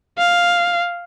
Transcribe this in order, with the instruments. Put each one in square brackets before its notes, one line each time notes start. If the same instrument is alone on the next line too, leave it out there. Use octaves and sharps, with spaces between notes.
[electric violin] F5